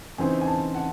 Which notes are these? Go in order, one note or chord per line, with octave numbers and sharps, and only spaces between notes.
C#3 E3 C4 D#4 G#5
G#5
A5
F#5